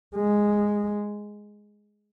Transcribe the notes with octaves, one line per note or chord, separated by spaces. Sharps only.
G#3